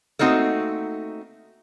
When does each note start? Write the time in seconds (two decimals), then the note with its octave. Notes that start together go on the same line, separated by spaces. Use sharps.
0.19 A3 A#3 C4 D#4 F#4